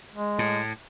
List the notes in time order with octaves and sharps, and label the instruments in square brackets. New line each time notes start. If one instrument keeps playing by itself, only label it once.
[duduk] G#3
[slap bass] A2